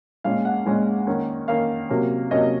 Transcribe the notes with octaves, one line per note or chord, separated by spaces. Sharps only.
A#2 G#3 C#4 F5
F#5
A#2 G#3 C#4
D#3 A#3 C#4
D#3 A#3 C#4 F5
C3 F#3 A#3 C#4
C3 F#3 A#3 C#4 D#5